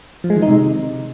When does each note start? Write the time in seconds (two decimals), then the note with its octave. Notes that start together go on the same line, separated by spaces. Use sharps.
0.24 F3
0.30 G#3
0.36 D#3
0.42 D#4
0.48 C3